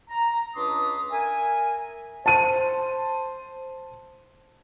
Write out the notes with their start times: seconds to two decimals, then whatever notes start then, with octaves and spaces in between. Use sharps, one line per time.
0.10 A#5
0.56 C#2 D4 B4 C6 D6 D#6
1.11 A#4 E5 G#5
2.26 C5 A5 D#7